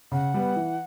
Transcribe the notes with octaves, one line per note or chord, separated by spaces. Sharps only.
C#3 F#5
G3 B3
E3